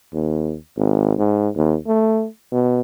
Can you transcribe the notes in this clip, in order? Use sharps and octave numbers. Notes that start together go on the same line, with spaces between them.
D#2
G#1
G#2
D#2
A3
B2